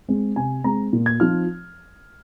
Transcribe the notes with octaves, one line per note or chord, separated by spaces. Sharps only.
G#3 C4
C3 G#5
G#3 C4 A#5
A#2
G#6
F3 C4 D#4 F6